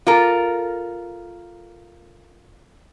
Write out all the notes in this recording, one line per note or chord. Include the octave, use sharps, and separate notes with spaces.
F4 A4 A#4